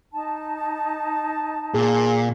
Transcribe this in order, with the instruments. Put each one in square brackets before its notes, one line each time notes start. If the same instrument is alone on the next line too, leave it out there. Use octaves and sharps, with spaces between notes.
[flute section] D#4 A5
[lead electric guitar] A#2 [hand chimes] G#4